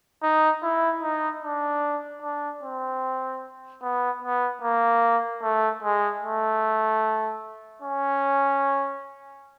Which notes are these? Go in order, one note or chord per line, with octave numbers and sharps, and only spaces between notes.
D#4
E4
D#4
D4
D4
C4
B3
B3
A#3
A3
G#3
A3
C#4